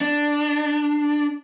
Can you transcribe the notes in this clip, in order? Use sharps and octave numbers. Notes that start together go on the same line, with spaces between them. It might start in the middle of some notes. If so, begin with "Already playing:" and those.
D4